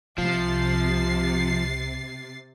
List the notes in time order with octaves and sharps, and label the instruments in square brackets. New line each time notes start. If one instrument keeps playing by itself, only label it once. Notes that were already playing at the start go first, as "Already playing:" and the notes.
[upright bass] C2 [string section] C3 A6 C7 [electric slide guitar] F3